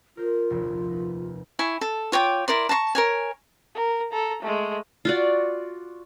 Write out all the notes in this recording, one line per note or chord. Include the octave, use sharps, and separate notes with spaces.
F4 A#4 C5
F1 A#1 D#2
D#4 B4
E4 G#5 C#6
A4
F4 C#5 G5 D6
E4 A#4 D5 C6
A5 A#5 C6 C#6
A#4 C#5 G#5
A#4
A4 A#5
G#3 A3
F4 F#4 D5